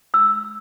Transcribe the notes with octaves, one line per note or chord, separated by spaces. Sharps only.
E6